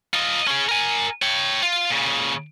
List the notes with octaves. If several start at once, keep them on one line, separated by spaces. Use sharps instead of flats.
F4 D#5
C#4 G#4
A#4 G#5
C#5 G5
F4
A#2 C#3